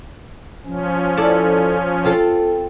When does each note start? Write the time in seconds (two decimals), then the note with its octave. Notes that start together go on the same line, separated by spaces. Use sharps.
0.65 F3 C#4
1.17 E4 A4 D5
2.05 C4 F4 A4